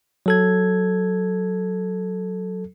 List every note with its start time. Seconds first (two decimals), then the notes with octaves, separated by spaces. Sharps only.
0.26 F#3 A4 G#6